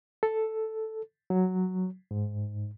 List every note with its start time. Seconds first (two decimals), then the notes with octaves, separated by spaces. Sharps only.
0.23 A4
1.30 F#3
2.11 G#2